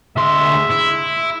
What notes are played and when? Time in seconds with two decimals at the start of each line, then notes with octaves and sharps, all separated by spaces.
0.16 D2 G#3 E5 C6
0.70 E4